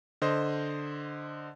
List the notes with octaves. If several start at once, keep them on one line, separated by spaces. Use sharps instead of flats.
D3 C5 D#5